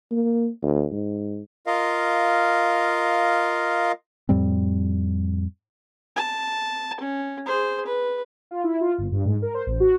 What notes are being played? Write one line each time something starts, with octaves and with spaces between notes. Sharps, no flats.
A#3
D2
G#2
F4 A#4 D#5 F5
F2 A2 G3 C4
A5
C#4
G#4 C5
B4
F4
E4
F4
G1
G2
G#2
A#4
C5
A1
F#4